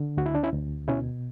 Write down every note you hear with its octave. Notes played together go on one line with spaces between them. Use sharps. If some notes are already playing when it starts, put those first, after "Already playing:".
Already playing: D3
D2 F#4
E4
D4
C#4 E4
D2
B2 C#4 E4